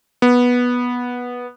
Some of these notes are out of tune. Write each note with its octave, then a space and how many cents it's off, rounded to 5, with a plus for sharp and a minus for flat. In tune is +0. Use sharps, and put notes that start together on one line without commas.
B3 -10